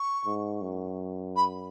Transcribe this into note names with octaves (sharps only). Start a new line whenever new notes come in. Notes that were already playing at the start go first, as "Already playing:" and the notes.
Already playing: C#6
G#2
F#2
B5